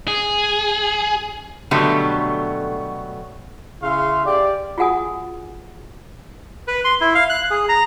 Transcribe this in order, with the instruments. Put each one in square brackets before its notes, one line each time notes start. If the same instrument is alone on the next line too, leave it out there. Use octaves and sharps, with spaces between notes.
[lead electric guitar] G#4
[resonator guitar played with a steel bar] B2 D3 F#3 G3 A3
[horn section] C#3 E4 G#4 E5 F5 C6
G4 D5
[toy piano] F4 F#4 G#4 F#5 G#5 D#6
[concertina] B4
C6
E4
F5
F#6
G#4
A#5